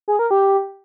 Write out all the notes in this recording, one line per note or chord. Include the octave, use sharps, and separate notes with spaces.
G#4
A#4
G4